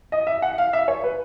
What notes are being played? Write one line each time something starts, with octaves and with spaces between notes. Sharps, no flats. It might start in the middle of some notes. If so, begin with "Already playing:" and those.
D#5
E5
F#5
F5
E5
C#5
B4